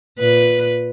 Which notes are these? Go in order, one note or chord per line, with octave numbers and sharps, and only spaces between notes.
A#2 B4